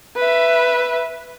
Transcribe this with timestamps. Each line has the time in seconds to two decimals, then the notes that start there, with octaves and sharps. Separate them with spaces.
0.17 B4 E5